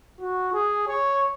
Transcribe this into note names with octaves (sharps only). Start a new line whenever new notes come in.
F#4
G#4
C#5